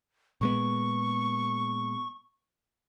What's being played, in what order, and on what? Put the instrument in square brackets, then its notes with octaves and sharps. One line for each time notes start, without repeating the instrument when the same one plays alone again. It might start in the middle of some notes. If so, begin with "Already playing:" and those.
[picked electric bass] A#2 G#3 B3 [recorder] C#6